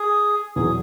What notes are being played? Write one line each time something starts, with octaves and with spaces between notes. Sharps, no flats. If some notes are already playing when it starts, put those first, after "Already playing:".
Already playing: G#4
E2 B2 F#3 G#4